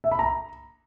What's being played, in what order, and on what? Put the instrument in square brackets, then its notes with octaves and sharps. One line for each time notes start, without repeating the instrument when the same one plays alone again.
[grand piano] E5
B5
A#5